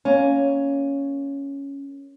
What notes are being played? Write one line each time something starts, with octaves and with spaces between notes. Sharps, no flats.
A#3 C#4